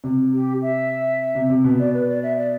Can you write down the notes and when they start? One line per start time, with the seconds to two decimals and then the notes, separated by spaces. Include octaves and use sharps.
0.04 C3
0.33 G4
0.62 E5
1.35 C3
1.50 C3
1.64 B2
1.79 D5
1.94 B4
2.09 D5
2.23 E5
2.38 D5